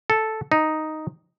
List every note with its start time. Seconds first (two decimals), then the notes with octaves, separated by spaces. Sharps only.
0.10 A4
0.52 D#4